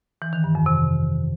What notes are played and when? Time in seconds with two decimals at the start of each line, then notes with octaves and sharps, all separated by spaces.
0.22 E3
0.33 D#3
0.44 G2
0.55 F2
0.66 C3